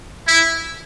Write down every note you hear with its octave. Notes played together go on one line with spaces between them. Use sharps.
E4